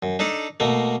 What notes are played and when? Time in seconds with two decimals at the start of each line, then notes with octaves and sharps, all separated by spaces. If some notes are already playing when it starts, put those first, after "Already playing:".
0.03 F#2
0.19 D4 D#4 A4 D5
0.60 B2 A3 A#3